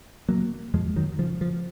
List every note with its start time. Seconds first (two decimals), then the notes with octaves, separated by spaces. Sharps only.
0.28 C#3 F#3 A#3
0.73 F2 F3 G#3
0.96 D#3 F#3
1.19 C#3 F3
1.41 F3